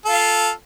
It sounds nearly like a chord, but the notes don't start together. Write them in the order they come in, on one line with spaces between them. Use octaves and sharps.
A4 F4 F5